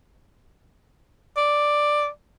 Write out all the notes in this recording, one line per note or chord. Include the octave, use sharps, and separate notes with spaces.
D5